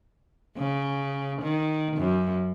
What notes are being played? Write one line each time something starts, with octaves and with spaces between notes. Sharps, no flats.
C#3
D#3
F#2